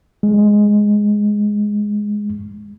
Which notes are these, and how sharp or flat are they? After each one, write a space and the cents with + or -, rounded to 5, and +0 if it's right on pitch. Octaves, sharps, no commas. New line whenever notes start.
G#3 +0